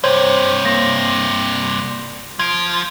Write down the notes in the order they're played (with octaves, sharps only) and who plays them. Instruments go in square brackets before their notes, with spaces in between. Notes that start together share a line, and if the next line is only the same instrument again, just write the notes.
[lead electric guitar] G2 C3 [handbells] C5 C#5
[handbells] A#3 A#6
[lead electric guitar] F3 [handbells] G#6 D7